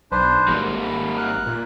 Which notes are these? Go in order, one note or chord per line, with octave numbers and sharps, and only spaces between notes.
B1 D4 B4 C5
G#1 G3 A#3
B5
A#4 F#6
A#2